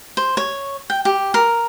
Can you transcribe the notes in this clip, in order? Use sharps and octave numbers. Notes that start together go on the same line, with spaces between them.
C5
C#5
G5
G4
A#4